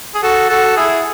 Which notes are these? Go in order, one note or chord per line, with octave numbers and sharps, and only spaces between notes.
G#4
F#4 A4
F#4 A4
E4 G#4